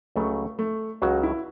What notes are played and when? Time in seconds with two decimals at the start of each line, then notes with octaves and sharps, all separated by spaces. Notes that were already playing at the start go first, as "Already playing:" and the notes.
0.16 C#2 C#3 F#3 A3
0.59 A3
1.02 C#2 C#3 F#3 F#4
1.23 E4